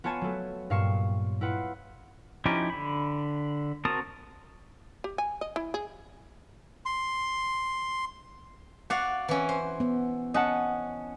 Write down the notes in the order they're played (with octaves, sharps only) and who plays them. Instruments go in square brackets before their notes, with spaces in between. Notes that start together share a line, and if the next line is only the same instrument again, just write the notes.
[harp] B3 F4 C#5 G#5 A5
F#3 A3
G2 A#2 F5 C#6 E7
E4 F4 B4 F#5
[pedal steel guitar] F3 C#4 D#4 E4 G4
D3 B5
C4 F#4 A#4 A5 D#6
[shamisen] G4
G#5
D#5
E4
G#4
[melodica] C6
[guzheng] F#4 D5 F5 [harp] F#5
[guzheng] E3 C#4
C5
[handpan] B3
[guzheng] C#4 [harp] D#5 F#5 A5